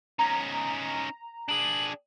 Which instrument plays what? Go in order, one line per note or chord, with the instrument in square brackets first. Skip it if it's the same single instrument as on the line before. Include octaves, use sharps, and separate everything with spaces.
[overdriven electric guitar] C#4 D#4 [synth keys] A#5
[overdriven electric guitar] D4 G#4 [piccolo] F#7